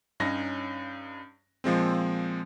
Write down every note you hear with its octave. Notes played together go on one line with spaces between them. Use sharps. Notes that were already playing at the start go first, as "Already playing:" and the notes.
G2 C#4 D#4 C#5 A#6
A#2 F3 G#3 C4